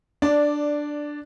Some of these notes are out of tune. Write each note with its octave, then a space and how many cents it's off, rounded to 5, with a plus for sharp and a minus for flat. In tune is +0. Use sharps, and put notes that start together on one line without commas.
D4 +5 D5 -5